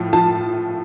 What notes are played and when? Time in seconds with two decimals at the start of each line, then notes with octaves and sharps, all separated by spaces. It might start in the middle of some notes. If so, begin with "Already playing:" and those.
Already playing: A2 F3
0.13 F3 A5